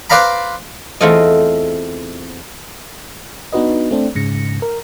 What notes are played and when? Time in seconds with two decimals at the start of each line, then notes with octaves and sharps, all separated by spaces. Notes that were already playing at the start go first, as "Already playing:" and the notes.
0.10 B4 C5 D5 F5 A#5 B5
1.01 E2 A3 C4 F4 A4 D#5
3.52 B3 D4 D#4 F#4 B4 D#5
3.91 A3 C4 D4
4.15 G#2 C#3 A#6 C#7
4.62 A#4